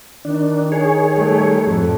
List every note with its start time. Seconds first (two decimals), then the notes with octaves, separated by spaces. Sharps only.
0.25 D#3 D4
0.72 G#4 C#5
1.16 G3 A3
1.66 F2 A2 A4